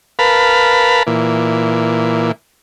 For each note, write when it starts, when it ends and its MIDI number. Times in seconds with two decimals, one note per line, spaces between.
0.19 1.03 70
0.19 1.03 71
0.19 1.03 77
0.19 1.03 81
0.19 1.03 83
1.07 2.32 46
1.07 2.32 52